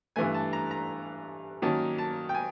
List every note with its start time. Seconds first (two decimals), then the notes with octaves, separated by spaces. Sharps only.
0.16 G2 E3 A3 G#5
0.34 A5
0.53 A#5
0.71 A#5
1.62 D#3 F#3 A#3 C#4 A5
1.98 A5
2.29 G5
2.35 G#5